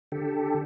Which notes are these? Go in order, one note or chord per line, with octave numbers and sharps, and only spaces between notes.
D3 G4 A4